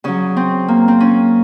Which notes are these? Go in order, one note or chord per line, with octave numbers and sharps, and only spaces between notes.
C#3 F#3 C#4
C4
A#3
C4
C#4